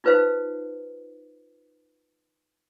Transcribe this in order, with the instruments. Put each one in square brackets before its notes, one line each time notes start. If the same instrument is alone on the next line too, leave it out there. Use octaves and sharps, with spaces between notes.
[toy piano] D#4 F4 B4 C5 F5